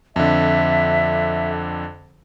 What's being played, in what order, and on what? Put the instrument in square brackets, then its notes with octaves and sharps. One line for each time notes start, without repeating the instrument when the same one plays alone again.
[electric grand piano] F2 D3 [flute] E5